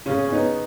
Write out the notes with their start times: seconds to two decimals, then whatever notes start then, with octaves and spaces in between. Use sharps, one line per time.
0.06 C#3 C#4
0.25 C#4
0.32 B3 D#4